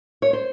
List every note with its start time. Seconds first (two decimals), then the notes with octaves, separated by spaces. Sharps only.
0.22 C#5
0.33 C5